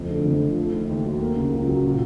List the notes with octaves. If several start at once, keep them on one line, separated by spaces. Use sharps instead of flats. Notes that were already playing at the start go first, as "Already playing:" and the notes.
Already playing: F2 A3
D3
F2
F3
A3
D#3
D#2
F#3
A#3
C#3
C#2
F#3
A#2